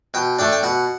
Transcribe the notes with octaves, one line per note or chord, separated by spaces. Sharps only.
B2 G5
A3 D4 G5
G5
B2 F#5